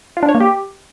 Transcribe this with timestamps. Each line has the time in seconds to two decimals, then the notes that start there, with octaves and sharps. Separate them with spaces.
0.17 F4
0.23 D4
0.29 C#5
0.35 A#3
0.40 G4